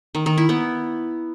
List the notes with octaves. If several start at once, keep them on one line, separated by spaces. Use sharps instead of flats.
D#3
D#3
E4
B3